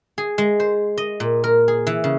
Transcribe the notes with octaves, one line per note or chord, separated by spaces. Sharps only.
G#4
G#3
C5
D#5
A#2
A#4
G#4
E3
C#3